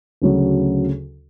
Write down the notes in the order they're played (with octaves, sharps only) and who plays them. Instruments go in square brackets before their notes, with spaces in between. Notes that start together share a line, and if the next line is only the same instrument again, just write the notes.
[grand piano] D2 C#3 F#3